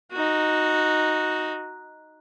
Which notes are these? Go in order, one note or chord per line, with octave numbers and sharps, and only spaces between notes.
D#4 F#4